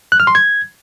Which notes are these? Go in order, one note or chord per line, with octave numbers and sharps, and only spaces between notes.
F#6
F6
C6
G#6